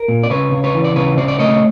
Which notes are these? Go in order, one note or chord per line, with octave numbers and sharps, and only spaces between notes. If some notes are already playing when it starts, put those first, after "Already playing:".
Already playing: A#4
A#2
D5
C#3 B4 C#5
C#3
B4 C#5
E3
D5
C#3 B4 C#5
C#3 C5 D5
D5
A3 C#5 D#5